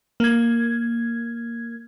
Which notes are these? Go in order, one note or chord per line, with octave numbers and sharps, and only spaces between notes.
A#3 G#6